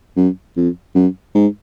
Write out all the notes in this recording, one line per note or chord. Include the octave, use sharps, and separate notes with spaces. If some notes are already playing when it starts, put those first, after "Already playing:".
F#2
F2
F#2
G#2